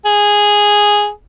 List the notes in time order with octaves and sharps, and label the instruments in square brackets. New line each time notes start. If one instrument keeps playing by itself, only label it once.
[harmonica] G#4